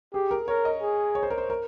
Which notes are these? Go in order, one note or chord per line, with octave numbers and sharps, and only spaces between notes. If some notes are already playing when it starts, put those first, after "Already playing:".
G4 G#4
A#4
A#4 C#5
D#5
G#4
C#5
C5
A#4
C5
A#4